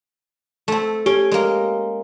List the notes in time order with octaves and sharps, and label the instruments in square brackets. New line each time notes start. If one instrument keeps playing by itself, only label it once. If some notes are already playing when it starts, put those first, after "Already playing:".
[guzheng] A3 C4
[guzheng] C#4 [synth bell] G4
[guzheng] G#3 A#3